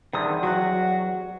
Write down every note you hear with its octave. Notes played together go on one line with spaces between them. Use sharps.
E2 G2 C3 D#3 D#6
F#3 F#4 F#6